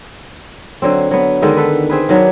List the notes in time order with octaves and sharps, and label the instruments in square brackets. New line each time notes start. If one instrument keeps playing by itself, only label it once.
[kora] D3 F#3 C4
F#3 B3
D3 D#3 G#3
A4 B4
C4 G#4 B4
D#3 F#3 B3 D4